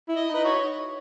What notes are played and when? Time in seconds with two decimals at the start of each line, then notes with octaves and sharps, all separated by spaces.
0.08 E4
0.16 D#5
0.30 D#4 B4
0.45 F#4 C#5